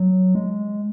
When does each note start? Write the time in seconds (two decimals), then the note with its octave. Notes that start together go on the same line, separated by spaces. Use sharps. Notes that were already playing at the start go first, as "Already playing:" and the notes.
Already playing: F#3
0.35 G#3